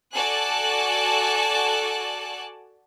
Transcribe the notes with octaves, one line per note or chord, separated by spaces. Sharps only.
F#4 A4 D5 G#5 A5 F#6